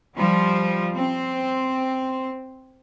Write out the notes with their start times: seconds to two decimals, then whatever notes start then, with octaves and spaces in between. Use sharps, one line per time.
0.16 F3 G3
0.95 C4